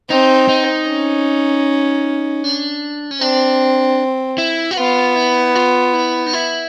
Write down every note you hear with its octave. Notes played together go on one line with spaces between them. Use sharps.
C4 D#4
D#4
C#4
D4
C#4
C4 D4
E4
F#4
B3 F4
E4
F4
E4
D#4
E4